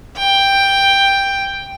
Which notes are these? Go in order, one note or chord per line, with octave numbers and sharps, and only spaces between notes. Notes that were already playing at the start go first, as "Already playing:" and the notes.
G5